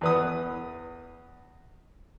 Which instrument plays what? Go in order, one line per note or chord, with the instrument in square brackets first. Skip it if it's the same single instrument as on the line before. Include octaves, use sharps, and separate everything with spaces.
[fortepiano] E2 B4 D#6